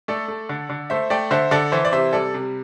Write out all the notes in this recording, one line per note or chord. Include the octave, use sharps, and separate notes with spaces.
A3 A4 D5
A3
D3
D3
A3 C5 E5
A3 D5 G5
D3 C5 E5
D3 A4 D5
E3 C5 E5
D5
C3 C5 E5
G3 A4 D5
C3